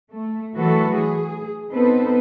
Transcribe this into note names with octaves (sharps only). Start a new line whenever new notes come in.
A3
E3 F#3 A3 F#4 A4 B4
G#4
B3 C4 D#4 A4 B4 C5